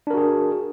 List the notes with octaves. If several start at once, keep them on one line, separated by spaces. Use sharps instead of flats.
D4 F#4 G#4 A#4